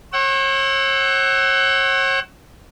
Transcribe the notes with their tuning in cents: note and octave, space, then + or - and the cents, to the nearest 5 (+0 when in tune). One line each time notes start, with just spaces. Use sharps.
C#5 -40 F#5 +30 E6 +0